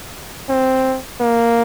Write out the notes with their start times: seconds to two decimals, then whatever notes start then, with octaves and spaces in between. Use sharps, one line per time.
0.49 C4
1.20 A#3